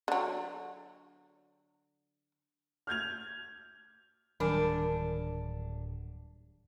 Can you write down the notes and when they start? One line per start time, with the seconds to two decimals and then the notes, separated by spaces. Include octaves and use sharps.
0.08 D3 F#3
2.87 F6 G6 G#6 F7
4.40 D1 D#3 F#3 G3 D4 A#4 G#5